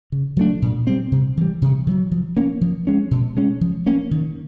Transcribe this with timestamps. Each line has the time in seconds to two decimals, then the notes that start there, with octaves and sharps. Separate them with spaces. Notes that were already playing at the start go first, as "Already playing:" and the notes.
0.12 C#3
0.37 F#3 A3 D4
0.62 A#2
0.87 G3 C4
1.12 C3
1.37 E3 G3
1.62 C3
1.87 D#3
1.91 F#3
2.11 F3
2.37 A#3 C#4
2.61 F3
2.87 G#3 C#4
3.11 B2
3.37 G#3 C#4
3.61 F3
3.86 A#3 C#4
4.11 D#3